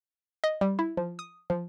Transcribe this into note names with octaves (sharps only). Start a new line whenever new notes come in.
D#5
G3
E4
F3
D#6
F3